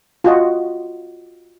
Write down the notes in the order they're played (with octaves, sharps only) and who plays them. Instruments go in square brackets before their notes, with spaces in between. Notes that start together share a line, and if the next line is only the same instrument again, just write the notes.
[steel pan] F4 F#4 D#5